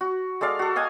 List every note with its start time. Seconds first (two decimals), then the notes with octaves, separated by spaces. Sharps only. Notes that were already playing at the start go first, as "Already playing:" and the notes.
0.01 F#4
0.41 G#3 A4 D5 F5
0.59 F#4 A4
0.76 D#5 F5 G#5